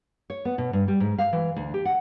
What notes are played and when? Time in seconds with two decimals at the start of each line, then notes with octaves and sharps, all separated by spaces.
0.30 C#5
0.45 B3
0.58 B2
0.73 G2
0.88 G3
1.00 G#2
1.18 F5
1.33 E3
1.56 D2
1.74 G4
1.85 F#5